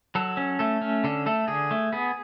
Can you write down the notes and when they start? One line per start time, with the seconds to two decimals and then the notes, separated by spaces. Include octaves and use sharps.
0.15 F#3 A4
0.37 C#4
0.59 A3 A4
0.81 C#4
1.04 D3 A4
1.26 A3 A4
1.48 D3 G#4
1.71 A3
1.92 B3 G#4